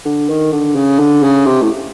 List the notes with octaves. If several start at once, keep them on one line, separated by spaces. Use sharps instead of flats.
D3
D#3
D3
C#3
D3
C#3
C3
A2